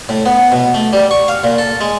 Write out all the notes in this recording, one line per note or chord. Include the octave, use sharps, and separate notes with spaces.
A2
B3
B2
A3
G3
C#6
F5
A#2
A4
G#3